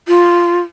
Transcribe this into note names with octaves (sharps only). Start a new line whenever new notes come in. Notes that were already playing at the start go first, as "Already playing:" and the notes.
F4